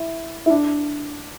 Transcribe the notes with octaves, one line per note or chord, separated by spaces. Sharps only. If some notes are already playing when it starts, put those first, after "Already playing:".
Already playing: E4
E4
D4